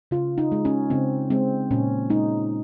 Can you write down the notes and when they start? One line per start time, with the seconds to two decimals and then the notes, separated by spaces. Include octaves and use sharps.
0.11 C#3 F4
0.38 D#4
0.52 G#3
0.65 C#4
0.90 C#3 C4
1.30 G#3 C4
1.71 A#2 C#4
2.10 G#3 D#4